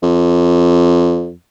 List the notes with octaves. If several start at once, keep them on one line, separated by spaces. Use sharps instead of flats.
F2